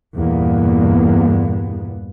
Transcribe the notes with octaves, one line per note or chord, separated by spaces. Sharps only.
E2 G2 A#2 G3 A#3 B3